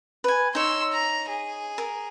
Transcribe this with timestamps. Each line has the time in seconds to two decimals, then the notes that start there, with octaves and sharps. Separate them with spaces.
0.24 B4 G#5
0.55 D#4 C#5 C6 E6
0.92 A#5
1.29 G#4
1.78 A#4